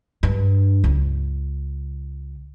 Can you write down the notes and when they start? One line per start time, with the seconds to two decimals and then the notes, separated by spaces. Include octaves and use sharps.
0.23 G2
0.84 C#2